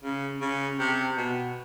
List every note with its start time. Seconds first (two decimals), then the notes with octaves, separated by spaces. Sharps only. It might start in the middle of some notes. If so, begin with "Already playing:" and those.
0.03 C#3
0.41 C#3
0.79 C3
1.17 B2